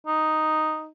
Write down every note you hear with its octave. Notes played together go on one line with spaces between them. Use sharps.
D#4